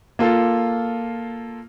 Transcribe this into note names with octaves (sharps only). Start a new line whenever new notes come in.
A#3 F4 A4